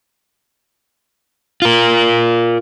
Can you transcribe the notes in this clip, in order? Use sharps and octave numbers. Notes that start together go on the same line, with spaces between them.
F4 A#4